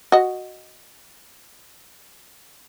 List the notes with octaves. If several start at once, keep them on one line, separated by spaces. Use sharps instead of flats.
F#4 D#5